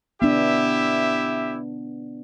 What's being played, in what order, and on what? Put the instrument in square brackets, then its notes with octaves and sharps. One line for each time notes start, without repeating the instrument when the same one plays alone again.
[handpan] B3 D4 [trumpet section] E4 G4 E5